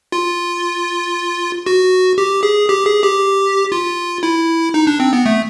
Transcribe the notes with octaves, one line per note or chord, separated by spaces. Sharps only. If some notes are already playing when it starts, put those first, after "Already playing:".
F4
F#4
G4
G#4
G4
G#4
G4
F4
E4
D#4
D4
C4
B3
A3